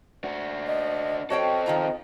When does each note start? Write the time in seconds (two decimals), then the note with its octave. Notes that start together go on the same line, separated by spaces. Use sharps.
0.24 D4 F#4
0.67 D#5
1.30 C4 F#4 A4 C#5 D#5 G5
1.66 D#3 F4 A#5